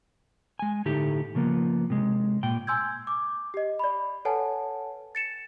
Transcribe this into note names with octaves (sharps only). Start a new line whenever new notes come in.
G#3 G#5
A2 D3 A3 D#4 G4
C#3 F3 A#3 B3
C3 G#3
A#2 G5
G#5 C6 E6 G6 G#6
D6
G4 D#5
D5 B5
A4 B4 C#5 F#5 G#5 A5
A6 C#7 E7